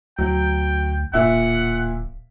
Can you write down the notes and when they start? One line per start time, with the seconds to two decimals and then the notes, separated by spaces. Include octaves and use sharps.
0.18 D2 F#3 G5
1.13 D1 A#2 E5 F#5